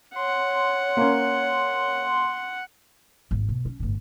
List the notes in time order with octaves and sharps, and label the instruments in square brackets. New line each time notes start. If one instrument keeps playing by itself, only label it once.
[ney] C#5 [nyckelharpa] F#5 [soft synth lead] C6
[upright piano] A#3 C#4
[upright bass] G#1 D#2
B2
C#4
G1 A2